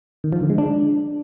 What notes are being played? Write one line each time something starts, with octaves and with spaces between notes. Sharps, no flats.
D#3
F3
D3
G#3
D4